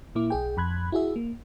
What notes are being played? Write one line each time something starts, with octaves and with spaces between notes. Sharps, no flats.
A#2 A#3 E4 D6
B1 G#4 G5
F2 B5 F#6 G#6
E4 F#4 G#4 E5
A#3